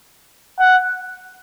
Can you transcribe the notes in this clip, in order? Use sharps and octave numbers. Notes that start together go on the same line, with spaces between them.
F#5